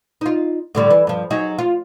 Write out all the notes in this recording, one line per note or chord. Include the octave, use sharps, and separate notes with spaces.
D#4 F4
A2 D3 G3
E3
G2 F3
F#3 D#4 G#4
F4